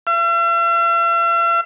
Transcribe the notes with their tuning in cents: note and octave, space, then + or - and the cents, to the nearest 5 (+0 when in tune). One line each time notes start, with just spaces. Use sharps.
E5 +45